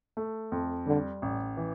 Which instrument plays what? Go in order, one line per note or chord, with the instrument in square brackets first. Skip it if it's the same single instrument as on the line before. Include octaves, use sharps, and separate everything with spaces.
[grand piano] A3
F2
[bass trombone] D3 [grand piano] G3
[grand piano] A1
E3